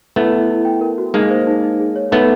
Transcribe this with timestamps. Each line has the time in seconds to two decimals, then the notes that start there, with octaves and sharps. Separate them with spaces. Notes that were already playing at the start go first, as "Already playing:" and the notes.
0.16 A3 B3 E4
0.32 E4
0.49 E4
0.65 G5
0.81 A#4
0.98 F#4
1.14 G#3 A#3 D#4
1.30 C5
1.47 D#4
1.63 D#4
1.80 G#4
1.96 C#5
2.11 A3 B3 D#4